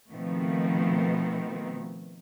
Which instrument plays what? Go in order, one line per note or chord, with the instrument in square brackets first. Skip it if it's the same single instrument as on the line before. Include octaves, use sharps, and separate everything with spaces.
[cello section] B2 D#3 F3 A3 B3 C4